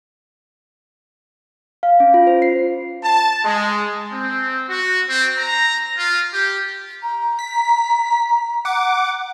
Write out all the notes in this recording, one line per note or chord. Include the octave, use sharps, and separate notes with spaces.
F5
C#4
F4
C5
C7
A5
G#3
C4
F#4
C4
A#5
F4
G4
A#5
B6
F#5 D6